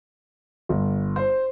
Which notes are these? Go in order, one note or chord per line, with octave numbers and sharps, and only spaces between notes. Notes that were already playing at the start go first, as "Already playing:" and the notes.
G1
C5